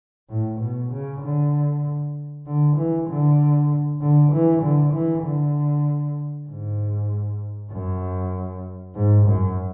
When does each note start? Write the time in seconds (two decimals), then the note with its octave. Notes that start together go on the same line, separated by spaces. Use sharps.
0.30 A2
0.61 B2
0.92 C#3
1.22 D3
2.47 D3
2.77 E3
3.09 D3
4.01 D3
4.32 E3
4.63 D3
4.93 E3
5.24 D3
6.48 G#2
7.72 F#2
8.95 G#2
9.27 F#2